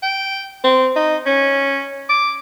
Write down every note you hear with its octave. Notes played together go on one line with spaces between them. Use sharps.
G5
C4
D#4
C#4
D6